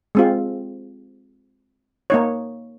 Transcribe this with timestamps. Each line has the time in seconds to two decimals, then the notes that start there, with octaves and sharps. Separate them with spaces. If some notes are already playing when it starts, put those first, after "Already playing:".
0.15 G#3 C4 F4
2.10 A#3 D#4 C#5